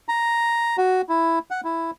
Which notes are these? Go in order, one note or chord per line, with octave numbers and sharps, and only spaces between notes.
A#5
F#4
E4
F#5
E4